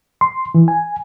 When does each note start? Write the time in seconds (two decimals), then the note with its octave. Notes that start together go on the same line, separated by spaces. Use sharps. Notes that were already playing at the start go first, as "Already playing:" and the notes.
0.21 C6
0.54 E3
0.68 G#5